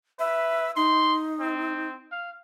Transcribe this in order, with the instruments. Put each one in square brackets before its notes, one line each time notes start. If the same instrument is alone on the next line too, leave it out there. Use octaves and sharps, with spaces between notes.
[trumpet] B4 [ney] E5
[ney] D#4 [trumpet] C6
[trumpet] C4
F5